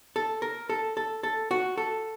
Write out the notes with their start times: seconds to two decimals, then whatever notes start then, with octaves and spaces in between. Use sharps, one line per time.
0.16 A4
0.42 A#4
0.70 A4
0.97 A4
1.23 A4
1.51 F#4
1.78 A4